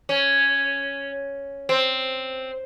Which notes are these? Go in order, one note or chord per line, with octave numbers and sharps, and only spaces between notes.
C#4
C4